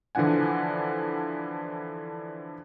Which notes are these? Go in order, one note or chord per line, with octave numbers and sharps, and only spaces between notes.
D3 E3 F3 D4 F#5 G#5